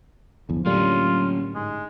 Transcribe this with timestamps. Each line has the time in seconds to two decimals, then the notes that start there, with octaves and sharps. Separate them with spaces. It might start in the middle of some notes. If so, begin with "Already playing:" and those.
0.49 G1 E2 F3
0.66 A2 D3 F#3 G3 A#3 C#4 F4
1.55 G#2 G#3